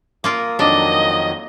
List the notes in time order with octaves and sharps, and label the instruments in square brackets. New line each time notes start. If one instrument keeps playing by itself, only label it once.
[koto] A#3 F4 A#4 [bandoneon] D#6
[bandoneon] F2 D#3 F#3 [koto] D4 [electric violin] D#5